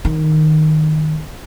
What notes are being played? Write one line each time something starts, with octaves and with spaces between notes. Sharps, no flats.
D#3